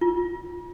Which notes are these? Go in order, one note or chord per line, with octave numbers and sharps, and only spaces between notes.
F4